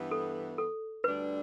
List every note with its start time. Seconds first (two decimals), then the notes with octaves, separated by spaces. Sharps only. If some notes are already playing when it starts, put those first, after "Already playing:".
Already playing: G2 E3 B3
0.11 A4
0.58 A4
1.04 D2 D3 G3 D4 B4